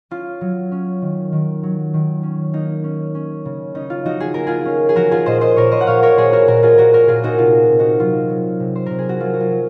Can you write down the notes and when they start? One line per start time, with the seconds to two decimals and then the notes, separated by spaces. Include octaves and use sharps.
0.11 C#4 F4
0.41 F#3
0.72 C#4
1.02 D#3
1.32 D#3
1.63 F#3
1.94 D#3
2.23 C#4
2.53 A#3 D#4
2.84 C#4
3.15 C#4
3.45 C#3
3.75 C#4 D#4
3.90 F4
4.05 F3 D#4 F#4
4.20 G#4
4.34 A#3 A#4
4.47 F4 G#4
4.65 C#4
4.89 G#4
4.96 F3 F#4 A#4
5.11 F4 G#4
5.26 A#2 C5 D#5
5.41 C5 D#5
5.56 A#2 A#4 C#5
5.71 C5 D#5
5.81 F#5
5.87 A#2 C#5 F5
6.03 A#4 C#5
6.17 A#2 G#4 C5
6.32 F#4 A#4
6.47 A#2 F#4 A#4
6.63 F4 G#4
6.78 A#2 F#4 A#4
6.93 F#4 A#4
7.08 A#2 F4 G#4
7.23 D#4 F#4
7.38 C3 F4
7.69 C3
7.79 D#4 F#4
8.00 F#3 F4
8.30 F#3
8.60 C3
8.75 C5
8.86 C3 A#4
8.99 G#4
9.09 F#4
9.20 F#3 F4
9.34 F#4
9.40 F4
9.51 F#3